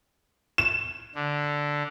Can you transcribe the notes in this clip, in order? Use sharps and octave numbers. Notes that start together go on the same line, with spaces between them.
E7
D3